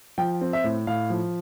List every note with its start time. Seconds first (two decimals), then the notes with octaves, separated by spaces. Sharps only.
0.18 F3 G5
0.41 C4
0.53 E5
0.64 A2
0.87 A2 F5
1.10 F3